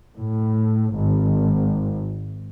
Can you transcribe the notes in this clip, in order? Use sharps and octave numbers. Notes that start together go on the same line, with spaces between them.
A2
G#1